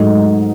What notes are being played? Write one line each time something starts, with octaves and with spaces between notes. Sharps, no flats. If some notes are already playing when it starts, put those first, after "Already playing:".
Already playing: G#2 F#3 A3 D#4